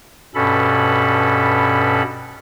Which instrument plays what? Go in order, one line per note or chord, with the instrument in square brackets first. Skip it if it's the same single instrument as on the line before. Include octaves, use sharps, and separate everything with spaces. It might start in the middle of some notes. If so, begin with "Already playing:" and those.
[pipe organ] G2 B2 C#4 A4 B5